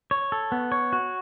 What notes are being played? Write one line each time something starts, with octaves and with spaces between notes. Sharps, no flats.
C#5
A4
B3
C#5
F#4